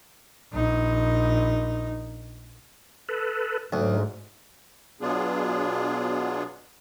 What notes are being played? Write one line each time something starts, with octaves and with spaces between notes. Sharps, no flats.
A#1 D#4
A4 B4
D2 G#2 F#3
B2 F#3 B3 D4 F4 G#4